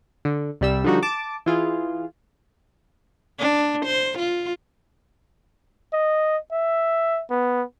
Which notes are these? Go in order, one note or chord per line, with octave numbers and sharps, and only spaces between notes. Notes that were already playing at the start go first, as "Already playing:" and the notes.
D3
C2 G3 E6
D3 F3 G3 D#4 F#4
A5 D6
E3 F4 G#4
D4
C5
F4
D#5
E5
B3